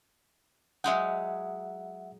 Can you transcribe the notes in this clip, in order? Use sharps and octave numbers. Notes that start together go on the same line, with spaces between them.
F#3 G#3 D#4 E5 F#5